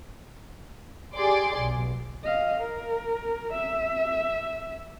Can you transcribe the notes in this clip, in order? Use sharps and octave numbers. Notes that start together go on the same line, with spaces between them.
G4 G#4 D5 C6 D6
B1
D#5 F5
A#4
E5